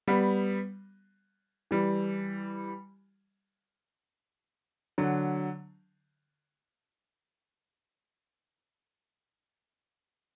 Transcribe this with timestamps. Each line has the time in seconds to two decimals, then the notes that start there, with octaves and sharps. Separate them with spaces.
0.08 G3 B3
1.71 E3 G3
4.98 D3 F#3